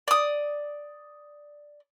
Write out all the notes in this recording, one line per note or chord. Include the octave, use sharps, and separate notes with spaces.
D5 D#6